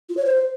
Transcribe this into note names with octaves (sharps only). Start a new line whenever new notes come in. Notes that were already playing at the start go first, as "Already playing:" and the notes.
F4
C#5
C5